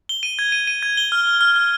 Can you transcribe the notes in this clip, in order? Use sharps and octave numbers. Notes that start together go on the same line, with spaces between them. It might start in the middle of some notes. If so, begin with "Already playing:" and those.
G7
D#7
G#6
D#7
D#7
G#6
G7
F6
F6
F6
F6